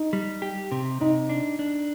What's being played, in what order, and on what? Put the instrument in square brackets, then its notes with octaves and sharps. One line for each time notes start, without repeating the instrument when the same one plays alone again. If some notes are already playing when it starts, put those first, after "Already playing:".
Already playing: [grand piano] D#4
[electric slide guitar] G3
G4
C3
[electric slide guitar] C3 [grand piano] D#4
[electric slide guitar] D4
D4